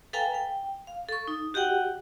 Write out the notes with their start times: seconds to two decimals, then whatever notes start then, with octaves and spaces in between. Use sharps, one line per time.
0.13 A4 B4 F5 G5 G#5 A#5
0.34 G5
0.87 F5
1.08 A4 C#6
1.28 D#4
1.54 F#4 G4 D#5 F#5 G5